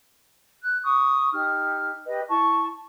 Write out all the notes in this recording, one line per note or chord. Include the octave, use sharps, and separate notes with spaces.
F#6
C#6 D#6
D#4 G4 F6
G4 B4 D#5
E4 A5 C#6